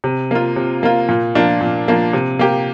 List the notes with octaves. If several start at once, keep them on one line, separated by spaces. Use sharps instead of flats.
C3
A#3 F4
C3
A#3 F4
A#2
F3 A#3 D4 F4
A#2
F3 A#3 D4 F4
C3
A#3 G4